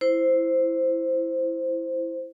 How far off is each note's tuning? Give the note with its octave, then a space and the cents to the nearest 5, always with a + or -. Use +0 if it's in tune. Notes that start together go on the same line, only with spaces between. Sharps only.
E4 +5 C5 +0